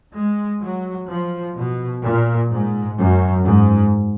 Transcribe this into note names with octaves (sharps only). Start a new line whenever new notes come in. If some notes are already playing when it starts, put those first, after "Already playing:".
G#3
F#3
F3
B2
A#2
G#2
F#2
G#2